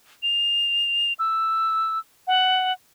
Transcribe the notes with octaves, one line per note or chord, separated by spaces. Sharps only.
F7
E6
F#5